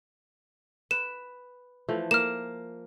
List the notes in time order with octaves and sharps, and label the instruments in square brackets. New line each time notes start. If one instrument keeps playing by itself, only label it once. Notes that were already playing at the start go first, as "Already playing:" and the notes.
[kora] B4 [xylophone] E7
[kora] E3 F3 A3
[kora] A#3 [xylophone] F6 E7